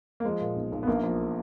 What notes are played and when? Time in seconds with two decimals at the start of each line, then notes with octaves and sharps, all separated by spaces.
0.20 A#3
0.25 F3 G#3
0.41 A#2
0.56 B1
0.72 B1
0.83 B3
0.87 A#1 A#3
1.04 F3